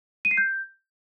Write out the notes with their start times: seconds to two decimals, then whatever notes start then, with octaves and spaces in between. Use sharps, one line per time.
0.25 D#7
0.31 C7
0.37 G6